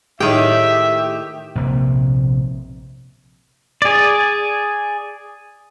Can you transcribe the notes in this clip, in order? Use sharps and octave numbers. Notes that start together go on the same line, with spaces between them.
A2 D#3 A#3 G4 G#4 E5 G5
A#1 C3 A#3
G#4 D5